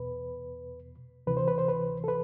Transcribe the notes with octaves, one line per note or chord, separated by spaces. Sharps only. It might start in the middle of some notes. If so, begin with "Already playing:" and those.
Already playing: E2 B2 B4
D2 C3 E3 B4
C5
B4
C5
B4
A4
B4